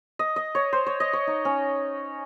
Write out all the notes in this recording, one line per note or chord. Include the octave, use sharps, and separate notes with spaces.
D#5
D#5
C#5
C5
C#5
D#5
C#5
D#4
C#4